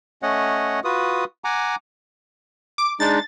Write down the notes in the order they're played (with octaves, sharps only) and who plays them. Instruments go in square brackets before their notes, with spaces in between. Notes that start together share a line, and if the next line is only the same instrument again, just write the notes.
[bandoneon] A3 C#4 C#5 D#5 F#5
F4 F#4 B4 D#6
F#5 G#5 A#5 D6
[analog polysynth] D6
[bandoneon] G#3 D4 D#4 [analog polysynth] A6